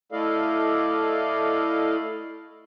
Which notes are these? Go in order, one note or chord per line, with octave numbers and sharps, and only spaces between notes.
A3 E4 A4 D5 D#5 F5